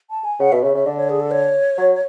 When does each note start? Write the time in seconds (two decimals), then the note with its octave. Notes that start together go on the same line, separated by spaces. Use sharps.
0.10 A5
0.24 G#5
0.40 C#3 F#5
0.52 B2 E5
0.63 C#3 E5
0.74 C#3 E5
0.86 D3 D5
0.97 C#5
1.09 G#4
1.20 A4
1.31 C#5
1.78 F#3